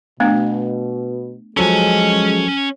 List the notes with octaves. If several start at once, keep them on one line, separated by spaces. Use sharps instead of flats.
B2 A3 B3 D4
F3 F#3 G#3 C#4 A4 G#5